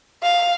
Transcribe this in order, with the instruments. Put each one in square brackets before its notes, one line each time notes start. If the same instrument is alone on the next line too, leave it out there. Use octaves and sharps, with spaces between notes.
[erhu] F5